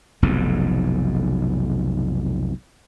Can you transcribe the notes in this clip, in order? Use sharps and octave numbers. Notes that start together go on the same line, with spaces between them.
F1 B1 F2 G#2